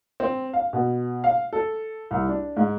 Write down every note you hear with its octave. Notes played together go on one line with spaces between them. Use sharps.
C4
F5
B2
F5
A4
C2
D4
G#2